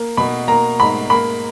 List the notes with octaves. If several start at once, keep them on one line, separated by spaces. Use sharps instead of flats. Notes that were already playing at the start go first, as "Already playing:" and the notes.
Already playing: A#3
B2 B5
A#3 A#5
G#2 B5
A#3 B5